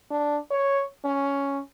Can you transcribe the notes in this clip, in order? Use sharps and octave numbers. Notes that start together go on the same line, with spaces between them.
D4
C#5
C#4